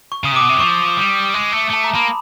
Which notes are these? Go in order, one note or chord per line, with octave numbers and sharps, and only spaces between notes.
C#6
C#3 D#6
C3
B2 D6
C3
F#3
F3 C#6
G3
G#3
A3
A3 A5
A#5
A#3 B5